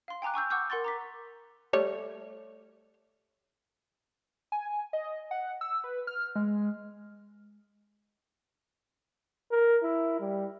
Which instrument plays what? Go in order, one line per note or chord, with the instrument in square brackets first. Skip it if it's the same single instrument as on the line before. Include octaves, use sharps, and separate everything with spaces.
[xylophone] F5 C6
G5 G#5 A#5 D6 F#6
G#5 C#6 E6 G6
F#5 C#6 D6 E6 F#6 G6
A#4 F#5 C6 C#6 A6
A#5 D6 B6
[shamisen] G3 A3 C#5
[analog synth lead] G#5
D#5
F#5
E6
B4
F6
G#3
[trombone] A#4
E4
G3